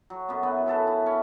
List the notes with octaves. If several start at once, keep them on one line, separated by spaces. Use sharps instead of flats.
F#3
F#2 B3
B3 E4 B4
C#4 E4 A4 B4
E4
C#4 E4